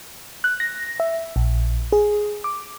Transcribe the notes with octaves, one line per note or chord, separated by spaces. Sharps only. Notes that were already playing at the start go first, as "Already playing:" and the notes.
F#6
A#6
E5
A#1
G#4
D6